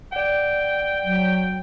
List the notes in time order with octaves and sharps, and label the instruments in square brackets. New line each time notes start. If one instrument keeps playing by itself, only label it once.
[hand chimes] D5 F#5 [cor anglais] G5
[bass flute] F#3